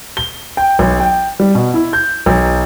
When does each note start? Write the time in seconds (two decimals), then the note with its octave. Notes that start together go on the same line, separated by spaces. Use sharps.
0.17 G7
0.57 G5
0.79 B1
1.00 G5
1.40 G3
1.55 B2
1.74 E4
1.93 G6
2.26 B1